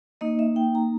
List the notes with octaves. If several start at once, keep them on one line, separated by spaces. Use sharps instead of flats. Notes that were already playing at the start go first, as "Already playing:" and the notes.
A#3 D#4 D#5
E5
G5
A#5